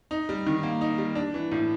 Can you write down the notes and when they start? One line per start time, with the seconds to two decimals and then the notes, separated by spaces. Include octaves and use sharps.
0.11 D#4
0.29 G3
0.47 D#3
0.63 A#3
0.81 D#4
0.98 G3
1.15 D4
1.34 E3
1.52 A2